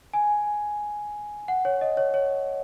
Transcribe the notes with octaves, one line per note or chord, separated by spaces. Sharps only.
G#5
F#5
C#5
D#5
C#5
C#5